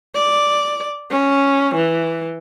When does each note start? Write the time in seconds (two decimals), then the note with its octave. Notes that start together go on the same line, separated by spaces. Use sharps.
0.15 D5
1.11 C#4
1.75 E3